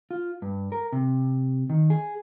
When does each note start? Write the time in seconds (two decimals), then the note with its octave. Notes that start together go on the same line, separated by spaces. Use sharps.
0.11 F4
0.42 G2
0.72 A#4
0.93 C3
1.70 D#3
1.90 G#4